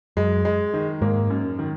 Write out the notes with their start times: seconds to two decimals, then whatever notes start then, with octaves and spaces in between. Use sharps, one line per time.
0.17 F#2 G#3
0.45 G#3
0.73 D#3
1.02 G#2 A#3
1.30 F#2
1.59 D#3